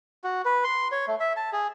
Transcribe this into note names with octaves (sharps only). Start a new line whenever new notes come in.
F#4
B4
C6
C#5
A3
E5
A5
G#4